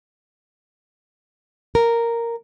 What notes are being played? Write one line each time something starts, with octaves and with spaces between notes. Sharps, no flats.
A#4